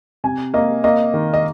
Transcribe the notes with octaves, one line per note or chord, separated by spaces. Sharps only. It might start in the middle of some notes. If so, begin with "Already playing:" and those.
C3 G#5
A#3 D#5
A#3 D#5
D#3
D#5